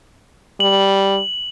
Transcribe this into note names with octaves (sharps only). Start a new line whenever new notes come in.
G3 F#7